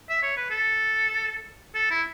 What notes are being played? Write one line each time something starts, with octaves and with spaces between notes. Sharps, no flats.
E5
C#5
B4
A4
A4
E4